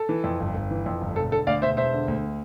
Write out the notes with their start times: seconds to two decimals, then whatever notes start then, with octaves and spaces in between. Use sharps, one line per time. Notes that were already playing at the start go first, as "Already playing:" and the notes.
Already playing: A4
0.09 E3
0.24 F2
0.40 G1
0.55 G1
0.71 E3
0.86 F2
1.01 G1
1.16 E1 A4
1.31 D3 A4
1.47 D2 D5 F5
1.62 E1 C5 E5
1.77 E1 C5 E5
1.93 D3
2.08 D2